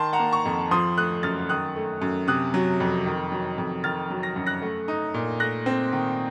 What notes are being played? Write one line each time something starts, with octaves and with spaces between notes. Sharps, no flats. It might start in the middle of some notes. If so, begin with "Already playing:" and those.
Already playing: D#3 A5 C6
F#5 A#5
A#3
A#5 C#6
F2
F3 C6 D#6
A3 D#6 F#6
F#2 F6 A6
D#3 D#6 F#6
A3
F#2
C3 D#6 F#6
F#3
F2
D#3
F#3
F2
D#3 F6 A6
F#3
A#6
F#2
F#6 A#6
A3
D#4
A#2
A3 F#6 A#6
C4
D#3